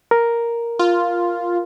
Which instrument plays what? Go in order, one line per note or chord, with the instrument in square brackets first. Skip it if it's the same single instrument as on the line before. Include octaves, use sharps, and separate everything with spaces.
[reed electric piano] A#4
[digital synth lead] F4